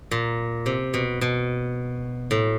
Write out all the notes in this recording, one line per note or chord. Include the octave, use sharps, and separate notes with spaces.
A#2
C3
B2
B2
A2